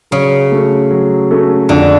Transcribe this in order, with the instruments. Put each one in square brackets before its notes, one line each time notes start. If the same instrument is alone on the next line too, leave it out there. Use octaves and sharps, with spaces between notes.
[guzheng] C#3 [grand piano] F#3
[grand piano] A3 C#4 F#4 A4
F#3
A3 C#4 F#4 A4
[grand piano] F2 [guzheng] D3